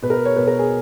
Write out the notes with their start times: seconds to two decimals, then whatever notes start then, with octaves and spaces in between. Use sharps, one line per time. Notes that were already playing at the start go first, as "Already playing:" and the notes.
0.02 B2 B4
0.10 A#4
0.13 B4
0.25 C#5
0.36 B2 B4
0.48 A#4
0.59 G#4